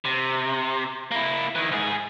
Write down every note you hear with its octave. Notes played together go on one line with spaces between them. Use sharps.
C3
A#3 E4
D#3 E3
G#2 G#4